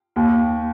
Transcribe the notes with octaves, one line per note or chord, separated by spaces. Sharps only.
D#2